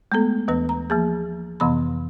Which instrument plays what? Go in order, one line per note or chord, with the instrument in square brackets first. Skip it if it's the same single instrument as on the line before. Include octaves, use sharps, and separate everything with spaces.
[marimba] G#3 A3 B3 A4
D#2 E3 B3 B4
A#5
F3 A#3 G#4
F2 C3 E3 B3 B5